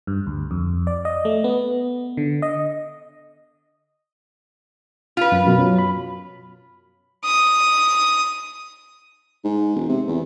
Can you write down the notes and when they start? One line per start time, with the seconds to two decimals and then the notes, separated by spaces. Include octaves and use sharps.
0.07 G2
0.27 D2
0.51 F2
0.87 D5
1.05 D#5
1.25 A3
1.44 B3
2.17 D3
2.42 D#5
5.17 F4 B4
5.32 F#2
5.47 F#2 B2
5.59 F#3
5.78 B5
7.24 D#6
9.44 G#2
9.76 E1
9.88 C3
10.08 E2